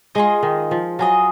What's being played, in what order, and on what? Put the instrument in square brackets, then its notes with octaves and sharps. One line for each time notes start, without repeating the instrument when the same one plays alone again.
[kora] G#3 [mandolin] F4 G#4 D#5
[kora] D#3
F3
[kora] F#3 [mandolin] F4 G#4 D#5